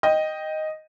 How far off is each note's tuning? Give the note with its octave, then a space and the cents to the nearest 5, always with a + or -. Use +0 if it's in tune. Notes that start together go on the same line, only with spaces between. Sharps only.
D#5 +0 G5 +0